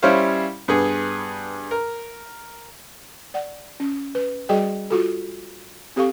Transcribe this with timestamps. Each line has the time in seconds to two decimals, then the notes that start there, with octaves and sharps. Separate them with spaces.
0.03 G3 C#4 E4 C5 C#5 F5
0.68 G2 B3 G#4
1.71 A#4
3.34 D5 F#5
3.80 C#4
4.15 B4
4.49 G3 F#4 G#4 D#5 G5
4.90 F4 F#4 A4
5.96 C4 G4 A4 F5 C#6